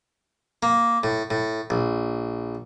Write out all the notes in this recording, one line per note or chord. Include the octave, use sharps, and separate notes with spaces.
A#3
A2
A2
A#1